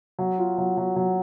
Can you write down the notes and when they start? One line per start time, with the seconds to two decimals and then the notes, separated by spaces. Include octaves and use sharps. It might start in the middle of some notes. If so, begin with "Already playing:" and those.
0.19 F#3
0.38 F4
0.58 F#3
0.77 F#3
0.96 F#3